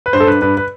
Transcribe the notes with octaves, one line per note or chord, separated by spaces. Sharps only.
B4
G2 C5
A4
G2 B4
G2 B4
B4